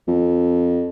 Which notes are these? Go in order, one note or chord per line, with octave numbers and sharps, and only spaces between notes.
F2